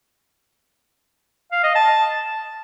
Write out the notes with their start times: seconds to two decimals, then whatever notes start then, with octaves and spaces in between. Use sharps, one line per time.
1.52 F5
1.63 D#5
1.75 A5